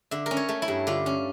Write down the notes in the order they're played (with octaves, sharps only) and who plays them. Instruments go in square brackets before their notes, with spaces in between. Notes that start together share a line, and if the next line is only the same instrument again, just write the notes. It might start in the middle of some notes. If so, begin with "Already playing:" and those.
[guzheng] D3 E5
C#4 A#4
C#5
A3
E4
G2
D3 F4
C#4